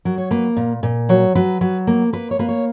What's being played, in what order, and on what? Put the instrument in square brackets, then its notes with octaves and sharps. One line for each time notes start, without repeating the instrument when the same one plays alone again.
[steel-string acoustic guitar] F#3 A#4
C#5
A#3 B4
A#2
A#2
F#3 C#5
F#3 B4
F#3 B4
A#3
A#3 B4
C#5
A#3 B4
C#5